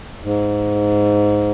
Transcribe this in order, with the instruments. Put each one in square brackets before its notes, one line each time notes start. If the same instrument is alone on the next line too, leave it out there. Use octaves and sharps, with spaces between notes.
[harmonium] G#2